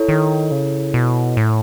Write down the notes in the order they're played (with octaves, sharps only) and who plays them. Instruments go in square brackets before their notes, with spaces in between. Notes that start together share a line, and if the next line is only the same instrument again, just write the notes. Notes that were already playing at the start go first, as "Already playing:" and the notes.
Already playing: [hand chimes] E4 A4 C#5
[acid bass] D#3
C#3
B2
A2